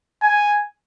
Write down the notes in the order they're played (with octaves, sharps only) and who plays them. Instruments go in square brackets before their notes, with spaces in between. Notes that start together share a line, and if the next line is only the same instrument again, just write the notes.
[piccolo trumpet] G#5